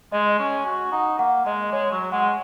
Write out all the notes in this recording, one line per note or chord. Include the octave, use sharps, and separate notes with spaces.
G#3 D#5
C#4
F#4
D#4 F#5
A#3 F#5
G#3 D#5
G#3 C#5
F#3
G#3 F#5